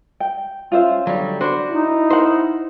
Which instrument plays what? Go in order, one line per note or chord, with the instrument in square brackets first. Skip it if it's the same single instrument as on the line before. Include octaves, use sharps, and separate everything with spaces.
[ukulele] G5
[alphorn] C#4 [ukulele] F4 C5 E5
[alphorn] D3 [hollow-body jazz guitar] F#3 G3
[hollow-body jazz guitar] D4 F#4 C5 [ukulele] B5
[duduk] D#4 [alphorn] E4
[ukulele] A#4 F#5 [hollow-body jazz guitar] C5